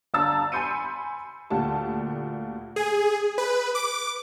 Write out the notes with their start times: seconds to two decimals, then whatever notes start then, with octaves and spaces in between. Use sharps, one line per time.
0.14 G1 D4 A5 A#5 E6 A6
0.52 G#5 B5 C6 G6 C#7 D#7
1.50 D2 A#2 F4 G4 A5
2.76 G#4
3.38 B4
3.75 D6